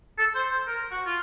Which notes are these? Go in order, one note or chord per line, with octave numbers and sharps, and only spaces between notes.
A4
C5
C5
A#4
F#4
F4